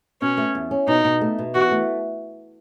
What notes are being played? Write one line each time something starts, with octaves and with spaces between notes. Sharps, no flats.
B2 C#4
A3
E2
C#4
B2 D#4
B2
A3
B2
E3 F#4
A3